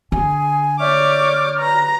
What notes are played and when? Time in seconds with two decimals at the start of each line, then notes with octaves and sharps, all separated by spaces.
0.12 D3 G#4 G#5
0.80 C#5 D5 E5 D6 F6 G6
1.60 B4 A#5